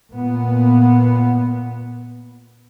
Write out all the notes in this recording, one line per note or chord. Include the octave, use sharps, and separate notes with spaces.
A#2 B3